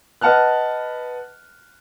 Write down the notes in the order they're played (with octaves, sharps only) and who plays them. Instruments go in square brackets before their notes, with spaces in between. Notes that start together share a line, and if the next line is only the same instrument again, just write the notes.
[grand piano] B4 D#5 F#5 A5 F6 F#6